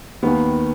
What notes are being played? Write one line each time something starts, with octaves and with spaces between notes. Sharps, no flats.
D#2 D#3 B3